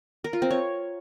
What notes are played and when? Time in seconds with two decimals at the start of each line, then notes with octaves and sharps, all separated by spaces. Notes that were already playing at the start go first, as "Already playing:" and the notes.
0.24 A#4
0.33 F4
0.42 C4
0.51 C#5